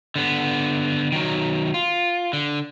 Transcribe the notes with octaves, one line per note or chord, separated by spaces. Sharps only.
D3 B3
D#3 F#3
F4
D3